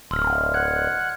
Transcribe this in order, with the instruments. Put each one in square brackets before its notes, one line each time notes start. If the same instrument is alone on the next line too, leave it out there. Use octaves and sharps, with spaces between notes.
[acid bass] D1 [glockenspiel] C6 E6 F6
[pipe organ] F#5 F#6 [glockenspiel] G#6